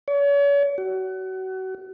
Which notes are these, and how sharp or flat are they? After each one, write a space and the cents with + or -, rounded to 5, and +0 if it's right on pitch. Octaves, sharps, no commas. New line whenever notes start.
C#5 +40
F#4 +30